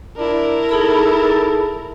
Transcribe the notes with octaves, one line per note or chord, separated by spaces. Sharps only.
D4 E4 A#4
D#4 G#4 A4 B5